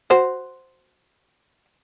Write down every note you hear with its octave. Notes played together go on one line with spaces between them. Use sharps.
F#4 C5